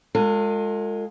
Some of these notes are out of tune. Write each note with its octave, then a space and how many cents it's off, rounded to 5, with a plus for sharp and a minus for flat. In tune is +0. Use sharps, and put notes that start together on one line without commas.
G#3 +0 F4 +30 A4 +40